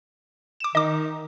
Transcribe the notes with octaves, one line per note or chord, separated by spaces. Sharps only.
D6 E7
D#3 D#4 D#5 D6